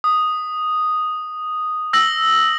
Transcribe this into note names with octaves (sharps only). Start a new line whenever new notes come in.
D#6
E6 A#6 F#7